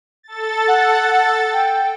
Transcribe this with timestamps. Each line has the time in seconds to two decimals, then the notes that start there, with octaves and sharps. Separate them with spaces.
0.23 A4 A6
0.68 F#5
1.53 G5